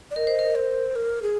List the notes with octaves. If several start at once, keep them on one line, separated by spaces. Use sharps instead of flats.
D5
A#4 D#5
C5
A#4
C5
A#4
G#4